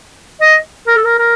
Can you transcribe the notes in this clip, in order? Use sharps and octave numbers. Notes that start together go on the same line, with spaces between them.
D#5
A#4
A4
A#4
A#4